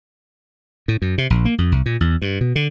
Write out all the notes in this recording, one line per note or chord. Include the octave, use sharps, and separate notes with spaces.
A2
F#2
C3
A#1
A#3
F2
C2
A#2
E2
G2
B2
D3